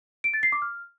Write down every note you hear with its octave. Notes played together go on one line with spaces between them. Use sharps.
D7
A6
C7
D6
F6